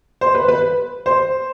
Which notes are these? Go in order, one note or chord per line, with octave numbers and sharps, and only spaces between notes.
C5
B4
B4
C5